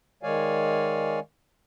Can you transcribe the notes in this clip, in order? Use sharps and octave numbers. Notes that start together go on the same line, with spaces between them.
D#3 G#3 C#5 D5 F5 G#5